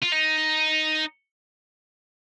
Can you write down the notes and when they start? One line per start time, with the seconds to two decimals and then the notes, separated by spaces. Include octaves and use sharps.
0.02 F4
0.12 D#4